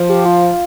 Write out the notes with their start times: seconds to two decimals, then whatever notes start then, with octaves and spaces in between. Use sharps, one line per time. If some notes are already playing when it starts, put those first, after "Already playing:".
Already playing: F3
0.09 G4
0.25 F4